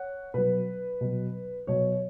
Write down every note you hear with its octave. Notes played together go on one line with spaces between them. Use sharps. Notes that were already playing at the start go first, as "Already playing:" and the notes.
Already playing: C#5 F#5
B2 F#3 B4
B2 F#3
B2 F#3 C#5